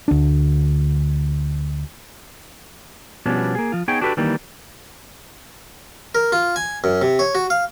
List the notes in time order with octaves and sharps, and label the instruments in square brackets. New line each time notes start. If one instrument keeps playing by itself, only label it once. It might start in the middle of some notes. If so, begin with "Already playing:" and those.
[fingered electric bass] D2 D4
[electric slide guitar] B2 F3 G3 B3 C#4 D4
A#3 G#4
F3 F4
B3 D#4 G#4 C#5 G5
D4 F#4 G4 A4 B4
D#3 E3 G3 A#3
[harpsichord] A#4
F4
G#5
F#2
C3
C#5
F#4
F5